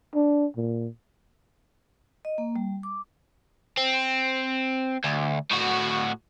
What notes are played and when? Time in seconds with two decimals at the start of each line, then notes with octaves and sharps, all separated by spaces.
0.15 D4
0.57 A#2
2.25 D#5
2.38 A#3
2.56 G3
2.83 D6
3.78 C4
5.04 D2
5.51 A2 F#4